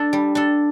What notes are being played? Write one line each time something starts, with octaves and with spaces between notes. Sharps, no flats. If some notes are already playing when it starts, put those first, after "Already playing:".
Already playing: D4 A4
G3
D4 A4